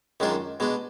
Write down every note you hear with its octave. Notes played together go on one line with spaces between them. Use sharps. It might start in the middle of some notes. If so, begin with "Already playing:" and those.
F#2 D#3 G#3 D4 F4
B2 G#3 D4